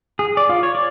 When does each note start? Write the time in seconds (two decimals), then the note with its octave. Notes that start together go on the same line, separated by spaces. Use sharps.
0.19 G#4
0.37 D5
0.49 F4
0.63 C#5
0.75 D5